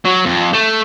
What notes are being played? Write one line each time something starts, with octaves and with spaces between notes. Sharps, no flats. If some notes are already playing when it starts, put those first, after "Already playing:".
F#3
F2
A3